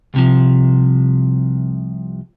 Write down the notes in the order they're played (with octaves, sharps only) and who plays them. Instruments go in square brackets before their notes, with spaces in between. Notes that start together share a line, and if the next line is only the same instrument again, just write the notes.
[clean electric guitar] C2 C3 F3